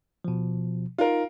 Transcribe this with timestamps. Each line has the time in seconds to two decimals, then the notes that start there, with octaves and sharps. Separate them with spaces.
0.25 B2 F3
0.99 D#4 F4 A#4